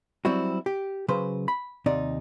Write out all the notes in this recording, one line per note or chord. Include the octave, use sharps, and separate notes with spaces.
F#3 G3 C4 E4 F#4
G4
C#3 F#3 B4 C5
B5
D#2 C3 D#4 D5